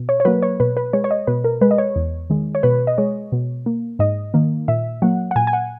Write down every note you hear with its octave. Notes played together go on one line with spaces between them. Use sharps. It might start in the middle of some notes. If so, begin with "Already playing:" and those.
Already playing: B2
C#5
C#5
F#3 A#3 B4
C#5
B2 B4
B4
G#3 C#5
C#5
D#5
B2 B4
A#4
G#3 B4
D#5
C#5
E2
D#3 G#3
C#5
B2 B4
D#5
G#3 C#5
B2
A#3
G#2 D#5
D#3 A#3
A#2 E5
F#3 A#3 F#5
F#5
A#2 G#5
G#5
F#5